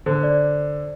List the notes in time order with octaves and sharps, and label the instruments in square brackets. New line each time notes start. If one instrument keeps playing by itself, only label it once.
[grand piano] D3 [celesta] C5
[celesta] D5